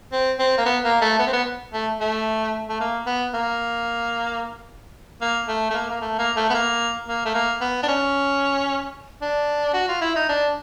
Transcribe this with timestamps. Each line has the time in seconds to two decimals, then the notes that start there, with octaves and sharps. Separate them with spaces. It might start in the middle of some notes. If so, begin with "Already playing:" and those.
0.12 C4
0.39 C4
0.58 A#3
0.66 B3
0.84 A#3
1.01 A3
1.19 B3
1.27 C4
1.33 B3
1.73 A3
2.01 A3
2.69 A3
2.80 A#3
3.06 B3
3.34 A#3
5.21 A#3
5.48 A3
5.70 A3
5.74 A#3
5.90 A#3
6.01 A3
6.19 A#3
6.36 A3
6.50 B3
6.54 A#3
7.08 A#3
7.25 A3
7.34 A#3
7.61 B3
7.83 D4
7.88 C#4
9.22 D4
9.74 F#4
9.88 F4
10.01 E4
10.16 D#4
10.29 D4